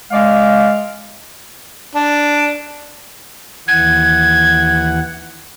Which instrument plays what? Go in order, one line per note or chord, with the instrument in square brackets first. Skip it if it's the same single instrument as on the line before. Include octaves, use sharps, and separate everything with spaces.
[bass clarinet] G#3 [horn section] D5 F5
[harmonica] D4
[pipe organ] D#2 E3 F#5 [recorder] G#6